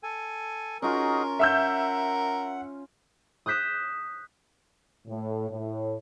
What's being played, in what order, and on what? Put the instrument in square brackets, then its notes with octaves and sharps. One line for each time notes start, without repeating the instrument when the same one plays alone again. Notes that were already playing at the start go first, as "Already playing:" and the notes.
[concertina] A4 G#5
[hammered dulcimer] C#4 F4 [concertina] D#4 F#4 G#4 [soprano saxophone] A#4
[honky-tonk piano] E5 E6 G6 [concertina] F#5
[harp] D#6 F#6 G6 B6 E7
[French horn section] A2
A2